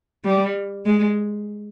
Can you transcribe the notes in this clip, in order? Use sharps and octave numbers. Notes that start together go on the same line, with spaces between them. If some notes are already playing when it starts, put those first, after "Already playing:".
G3
G#3